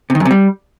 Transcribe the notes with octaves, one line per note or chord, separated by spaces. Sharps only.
C3
D#3
F#2
C3
G3